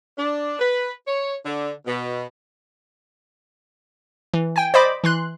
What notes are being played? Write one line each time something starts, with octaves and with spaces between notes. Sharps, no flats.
D4
B4
C#5
D3
B2
E3
G5 G#5
C5 D5 D#5 B5 D6
E3 C6 F#6